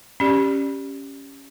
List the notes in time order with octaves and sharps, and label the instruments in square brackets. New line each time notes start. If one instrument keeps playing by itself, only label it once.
[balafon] C#4 G4 D5